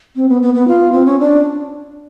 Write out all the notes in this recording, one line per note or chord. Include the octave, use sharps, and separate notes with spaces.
C4
B3
B3
B3
F4
C4
C#4
D4